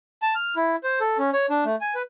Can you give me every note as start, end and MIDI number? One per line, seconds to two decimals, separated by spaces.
0.22 0.34 81
0.35 0.55 89
0.56 0.76 64
0.84 0.99 72
1.00 1.18 69
1.18 1.30 61
1.33 1.46 73
1.50 1.64 62
1.65 1.76 57
1.81 1.94 80
1.95 2.02 71